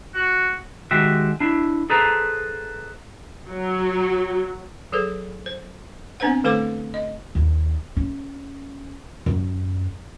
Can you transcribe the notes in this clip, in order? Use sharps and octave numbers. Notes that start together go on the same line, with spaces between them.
F#4
D#3 G#3 F#4 G4 E5
D4 E4
G#4 A4 B4 C5 A#5
F#3
F#3 G#4 A4 B4
C5
B3 C4 D4 B4 C5 F#5
D3 A3 A4 B4 C5 D6
D#5
D#2
C#4
F#2